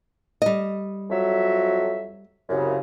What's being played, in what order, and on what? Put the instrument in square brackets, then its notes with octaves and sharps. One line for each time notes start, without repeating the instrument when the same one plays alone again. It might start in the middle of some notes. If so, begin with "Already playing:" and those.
[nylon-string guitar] G3 D#5
[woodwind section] F2 F#3 E5
C2 F#2 C#3